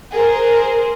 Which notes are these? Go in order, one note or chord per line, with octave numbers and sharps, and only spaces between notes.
G#4 A#4 C5